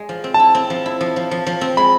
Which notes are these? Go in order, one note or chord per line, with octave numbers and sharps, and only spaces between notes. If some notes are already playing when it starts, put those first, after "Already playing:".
Already playing: G#3
F3
C4
A5
E4
C4
F3
E4
F3
F3
F3
F3
C4
G#3 B5